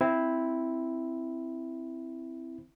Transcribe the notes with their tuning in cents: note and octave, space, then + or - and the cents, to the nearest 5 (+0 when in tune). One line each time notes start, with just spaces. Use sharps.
C4 +0 E4 +0